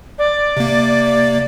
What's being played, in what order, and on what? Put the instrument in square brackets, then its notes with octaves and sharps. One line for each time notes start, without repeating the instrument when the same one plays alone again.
[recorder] D5
[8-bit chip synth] C3 A#3